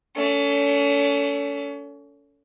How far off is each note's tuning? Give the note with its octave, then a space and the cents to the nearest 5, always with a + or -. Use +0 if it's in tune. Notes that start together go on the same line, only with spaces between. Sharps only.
A3 +20 C#4 +40